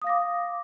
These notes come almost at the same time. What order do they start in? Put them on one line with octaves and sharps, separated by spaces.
D#6 F5 A#6 D6